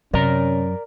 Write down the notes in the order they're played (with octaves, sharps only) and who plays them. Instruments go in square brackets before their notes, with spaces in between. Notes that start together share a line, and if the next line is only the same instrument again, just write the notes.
[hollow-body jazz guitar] F#2 [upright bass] C3 [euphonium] C#4 [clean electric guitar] A#4 D5 A#5